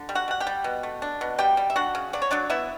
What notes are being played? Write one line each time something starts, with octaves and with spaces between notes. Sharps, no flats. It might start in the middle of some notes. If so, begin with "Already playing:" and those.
Already playing: D3
G3
F#4 F#5
G3 F#5
G4 G5
G3
B2
A3
D4
B2
G3 G4 G5
G3
E5
D4 F#4 F#5
C#3
F#3 D5
C#5
F#3 D4 D5
B3 E4 E5